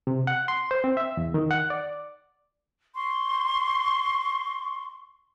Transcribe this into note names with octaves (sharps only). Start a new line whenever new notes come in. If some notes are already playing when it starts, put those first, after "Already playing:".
C3
F#5
C6
C5
C4
E5
E2
D#3
F#5
D5
C6 C#6